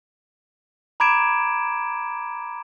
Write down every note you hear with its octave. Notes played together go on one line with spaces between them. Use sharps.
A#5 B5 D6 G#6 D7 E7